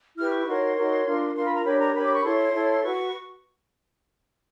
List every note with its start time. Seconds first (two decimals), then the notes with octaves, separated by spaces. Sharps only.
0.17 E4 G4 B4 F6
0.31 C#6
0.46 D#4 F#4 A#4 C#5 C6
0.76 D#4 F#4 A#4 C#5
1.05 D4 F4 A#4
1.35 D4 F4 A#4 C6
1.44 B5
1.54 A#5
1.64 D4 G4 A#4 C#5 B5
1.79 A#5
1.94 D4 G4 A#4 C#5 B5
2.04 D6
2.14 C#6
2.23 E4 A4 C#5 C6
2.53 E4 A4 C#5
2.82 F#4 B4 C#6